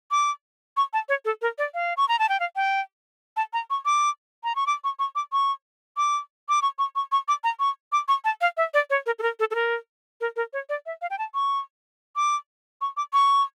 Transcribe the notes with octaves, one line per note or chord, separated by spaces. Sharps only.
D6
C#6
A5
C#5
A4
A#4
D5
F5
C#6
A#5
A5
G5
F5
G5
A5
A#5
C#6
D6
A#5
C#6
D6
C#6
C#6
D6
C#6
D6
D6
C#6
C#6
C#6
C#6
D6
A#5
C#6
D6
C#6
A5
F5
E5
D5
C#5
A#4
A4
A#4
A4
A4
A#4
A#4
A#4
C#5
D5
E5
F5
G5
A5
C#6
D6
C#6
D6
C#6